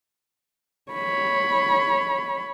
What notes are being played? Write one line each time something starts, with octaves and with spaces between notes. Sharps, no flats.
C#5 B5